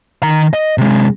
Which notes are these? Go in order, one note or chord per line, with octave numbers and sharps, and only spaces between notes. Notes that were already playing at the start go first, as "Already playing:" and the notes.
D#3 A#5
D#5
C3 G#3